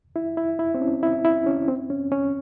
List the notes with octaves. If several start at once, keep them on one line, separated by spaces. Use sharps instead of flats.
E4
E4
E4
C4
C#4
E4
E4
C#4
C4
C#4
C#4